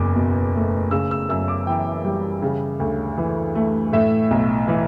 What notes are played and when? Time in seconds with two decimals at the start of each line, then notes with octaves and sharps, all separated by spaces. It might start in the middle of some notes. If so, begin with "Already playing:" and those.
Already playing: F#1 E2 D6
0.16 B2
0.55 A3
0.91 C#3 E6
1.11 E6
1.29 F#2 E6
1.48 D6
1.67 E3 G5
2.05 G3
2.42 C#3
2.80 D2
3.18 E3
3.55 A3
3.93 A2 E5
4.31 B1
4.68 E3